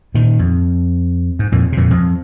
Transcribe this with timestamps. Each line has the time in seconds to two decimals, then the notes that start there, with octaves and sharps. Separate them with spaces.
0.14 A#2 D#3
0.39 F2
1.39 G#2
1.52 F2 A#2
1.72 C3
1.77 F2 A#2
1.90 F2